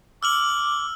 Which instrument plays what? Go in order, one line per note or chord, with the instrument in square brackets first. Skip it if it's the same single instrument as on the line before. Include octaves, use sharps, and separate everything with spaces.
[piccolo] D6 [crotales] E6 F6 F#7